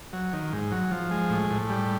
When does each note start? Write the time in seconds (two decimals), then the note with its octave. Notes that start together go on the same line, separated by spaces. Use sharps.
0.13 F#3
0.33 D#3
0.53 G#2
0.72 F#3
0.91 F3
1.11 G#3
1.30 A2
1.50 A2
1.70 G3